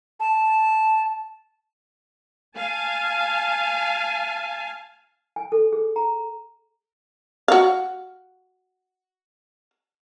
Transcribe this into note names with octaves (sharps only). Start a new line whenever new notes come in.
A5
F5 G#5 A5
G#5
A4
G#4
A#5
F#4 F5